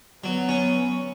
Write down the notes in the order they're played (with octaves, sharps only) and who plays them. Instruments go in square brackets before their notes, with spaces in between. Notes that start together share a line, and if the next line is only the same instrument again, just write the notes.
[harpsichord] F#3 [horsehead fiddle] B3
[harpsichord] C#4